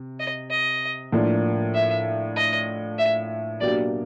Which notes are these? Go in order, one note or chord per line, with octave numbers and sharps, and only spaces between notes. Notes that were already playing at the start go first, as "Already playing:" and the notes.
Already playing: C3
D#5
D#5
A2 F3 A#3 D4
E5
D#5
E5
B2 F#3 A#3 D4 G4 D5